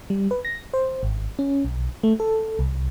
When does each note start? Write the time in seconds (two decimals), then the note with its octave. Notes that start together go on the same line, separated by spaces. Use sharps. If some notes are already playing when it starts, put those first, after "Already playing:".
0.10 G3
0.31 B4
0.45 A#6
0.74 C5
1.03 G#1
1.39 C#4
1.65 B1
2.03 A3
2.20 A4
2.59 C2